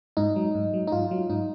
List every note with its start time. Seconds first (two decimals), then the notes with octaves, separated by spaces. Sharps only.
0.17 G#2 D#4
0.36 F#3
0.55 G#2
0.74 F#3
0.87 D#4
0.92 G#2 F4
1.11 F#3
1.29 G#2 D#4